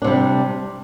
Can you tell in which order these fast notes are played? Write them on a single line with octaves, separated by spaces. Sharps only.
D4 C3 G3